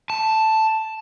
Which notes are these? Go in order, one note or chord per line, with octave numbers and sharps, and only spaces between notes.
A5